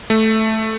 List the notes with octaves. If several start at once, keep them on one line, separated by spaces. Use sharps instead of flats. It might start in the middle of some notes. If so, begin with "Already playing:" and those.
A3